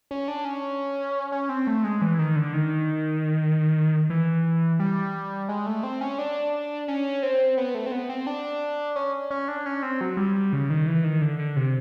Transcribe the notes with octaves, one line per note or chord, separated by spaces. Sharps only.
C#4
D4
C#4
C#4
C4
A3
G#3
E3
D#3
D3
D#3
E3
G3
G#3
A3
C4
C#4
D4
C#4
C4
B3
A3
C4
B3
C4
D4
C#4
C#4
D4
C#4
C4
F#3
G3
G3
C#3
D#3
E3
D#3
D3
D3
C3